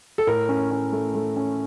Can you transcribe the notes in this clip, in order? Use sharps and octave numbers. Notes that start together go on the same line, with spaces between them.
A4
A2 A#4
C#4
C#4
A3
A3
C#4